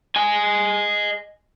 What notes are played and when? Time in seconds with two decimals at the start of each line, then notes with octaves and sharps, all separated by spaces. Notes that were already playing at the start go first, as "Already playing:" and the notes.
0.16 D#5 G#5